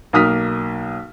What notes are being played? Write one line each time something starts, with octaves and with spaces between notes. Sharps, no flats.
B1 A#3 D#6 F6 B6